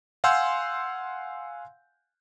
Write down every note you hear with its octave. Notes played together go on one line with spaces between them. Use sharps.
F5 F#5 G#5 C6 E6 G6